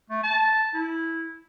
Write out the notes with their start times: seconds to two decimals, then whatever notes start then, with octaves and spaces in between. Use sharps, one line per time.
0.10 A3
0.23 A5
0.74 E4